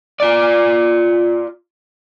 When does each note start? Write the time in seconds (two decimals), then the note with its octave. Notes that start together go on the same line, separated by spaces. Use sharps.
0.20 F4 D5